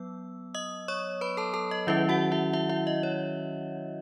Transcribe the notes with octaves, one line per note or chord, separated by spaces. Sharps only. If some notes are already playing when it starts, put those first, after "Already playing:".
Already playing: F#3 B3 E6
D#5 D#6
C#5 C#6
B4 B5
A4 A5
A4 A5
D#5
D#3 F#3 C#4 E4 E5
F#4 F#5
E4 E5
E4 E5
E4 E5
D#5
C#5